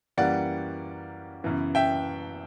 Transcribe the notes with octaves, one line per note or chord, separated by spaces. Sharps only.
F#2 E3 G3 A#3 D5 F#5
F#2 C#3 E3 B3
E5 G5